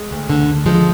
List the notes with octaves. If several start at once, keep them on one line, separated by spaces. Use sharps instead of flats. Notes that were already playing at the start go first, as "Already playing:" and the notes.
Already playing: G#3
D2
D3
D2
F3 G#3